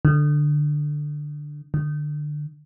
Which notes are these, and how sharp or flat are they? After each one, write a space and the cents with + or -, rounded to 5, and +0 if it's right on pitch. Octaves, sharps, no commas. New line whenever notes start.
D3 +10
D3 +20